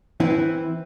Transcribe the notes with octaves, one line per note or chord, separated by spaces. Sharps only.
E3 C4 E4